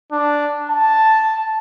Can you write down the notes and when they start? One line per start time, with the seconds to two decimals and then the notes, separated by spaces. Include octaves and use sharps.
0.12 D4
0.70 A5